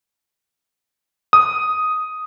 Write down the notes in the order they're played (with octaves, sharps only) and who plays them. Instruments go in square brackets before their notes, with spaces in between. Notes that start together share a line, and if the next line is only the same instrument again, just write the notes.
[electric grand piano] D#6